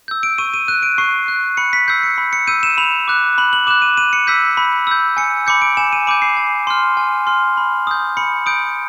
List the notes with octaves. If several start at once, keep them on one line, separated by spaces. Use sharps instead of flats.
E6 G6
D7
C#6 D#7
D#7
F#6 D#7
D7
C#6 C7
F#6
B5 C#7
B6
E6 G6 C7
C#7
B5
C#7
E6 G6 D#7
E7
B5 F7
D6 F#6
B5 F#7
F#7
D6 F#6 E7
D#7
B5 D#7
C#7
E6 G6 B6
B5
E6 G6
G#5 C#7
B5 D6 G6 C#7
D7
G#5 E7
D#7
B5 D6 G6 D7
C7
G#5
C6 F6
G#5
C6 F6
B5
D#6 G6
B5 C#7
D#6 G6 D7